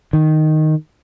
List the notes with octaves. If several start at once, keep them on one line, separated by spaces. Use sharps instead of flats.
D#3